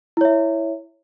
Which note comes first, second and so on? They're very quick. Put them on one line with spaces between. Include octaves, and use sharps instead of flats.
E4 C#5 E5